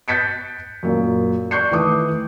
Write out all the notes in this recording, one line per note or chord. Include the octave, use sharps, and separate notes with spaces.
F#6 G6 A6 B6 C#7 D7
F#2 A#2
D5 C#6 F#6 G6 C7 C#7
D#3 E3 A3 D6 D#6